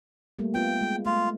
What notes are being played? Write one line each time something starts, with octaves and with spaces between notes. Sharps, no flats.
G3 A3 A#3
B3 F4 G5
G#3
A3 F4